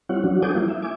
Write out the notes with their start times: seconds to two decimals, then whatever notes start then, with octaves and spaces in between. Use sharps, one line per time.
0.09 G3 C4 E4 F4 C#5 F#5
0.24 F3 F#3 C#4 D4 F#4
0.42 A4 C5 G#5 D6 D#6 G6
0.55 G3 A#3 E4 F4
0.68 E5
0.82 E5 G#5 D6